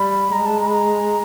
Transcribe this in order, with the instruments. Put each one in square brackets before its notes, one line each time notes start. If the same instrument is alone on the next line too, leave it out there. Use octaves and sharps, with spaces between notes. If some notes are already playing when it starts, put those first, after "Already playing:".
Already playing: [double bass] G3 [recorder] B5
[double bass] G#3 [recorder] A#5
[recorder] A5
A#5
B5
A#5